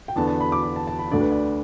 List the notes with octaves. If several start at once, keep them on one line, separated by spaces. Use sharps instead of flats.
G5
E2 D3 B3 D4 A5
A5
B5
D6
B5
A5
A5
B5
D2 D3 A3 D4 D5
B4
D5